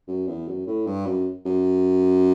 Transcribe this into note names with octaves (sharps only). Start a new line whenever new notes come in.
F#2
E2
F#2
A2
G2
F#2
F#2